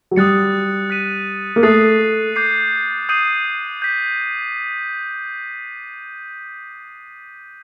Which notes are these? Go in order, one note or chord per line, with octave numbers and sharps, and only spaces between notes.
F#3
G3 D#6 F#6 A6 C#7
F#6 B6 D#7
A#3
A3 D#6 F#6 A6 C7
D6 G6 C7
D#6 G6 C7 D#7 F#7
G6 B6